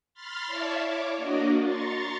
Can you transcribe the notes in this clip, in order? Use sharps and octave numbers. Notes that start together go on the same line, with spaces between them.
B5 C6 F6 A6
E4 C#5 D5 E5 F5 A5
C#5 D6
A#3 D4 F#4 D5 D#5
A#5 C6 C#6 A6